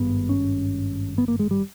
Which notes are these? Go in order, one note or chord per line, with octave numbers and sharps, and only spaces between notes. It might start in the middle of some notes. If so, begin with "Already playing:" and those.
Already playing: G#1 G2 B3
C#4
B3
A#3
G#3
G3